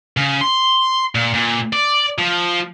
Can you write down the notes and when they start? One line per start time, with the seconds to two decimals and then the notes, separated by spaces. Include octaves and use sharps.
0.17 C#3
0.41 C6
1.15 A#2
1.34 A#2
1.73 D5
2.19 F3